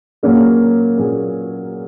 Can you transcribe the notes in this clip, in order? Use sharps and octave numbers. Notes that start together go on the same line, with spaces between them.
A#2 F#3 A#3 C#4 G#4
A#2 F#3 A#3 C#4 G#4